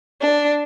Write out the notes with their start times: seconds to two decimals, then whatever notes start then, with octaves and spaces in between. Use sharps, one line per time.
0.21 D4